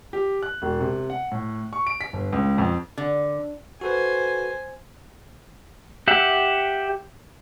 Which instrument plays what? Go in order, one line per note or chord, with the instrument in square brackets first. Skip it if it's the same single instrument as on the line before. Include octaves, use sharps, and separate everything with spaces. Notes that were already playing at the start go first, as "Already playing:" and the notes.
[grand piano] G4
F#6
E1
C3
F#5
A2
C#6
D7
B6
G1
C#2
F2
[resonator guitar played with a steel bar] D3
[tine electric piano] F#4 A4 B4 [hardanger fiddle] C5 G#5
[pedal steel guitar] G4 E5 F#5